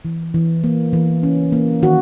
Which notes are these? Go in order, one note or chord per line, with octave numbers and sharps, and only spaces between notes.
E3
E3
A#3
E3
C#4
A#3
D#3 F#4